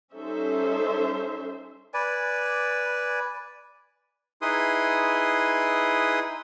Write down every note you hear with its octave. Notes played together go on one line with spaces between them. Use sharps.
G3 C#4 D#4 A4 C5 E5
B4 D5 G#5
D#4 E4 G#4 B4 C6 D#6